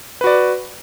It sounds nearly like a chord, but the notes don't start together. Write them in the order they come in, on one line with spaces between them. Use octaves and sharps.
B4 F#4 D5